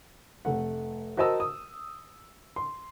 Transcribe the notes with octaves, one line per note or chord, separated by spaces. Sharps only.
F1 A3 F#5
F#4 A#4 C5 D#5 A5 E6
D#6
C6